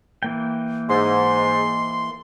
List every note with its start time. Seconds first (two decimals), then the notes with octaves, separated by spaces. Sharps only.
0.23 E3 A#3 G5
0.89 G#2 C6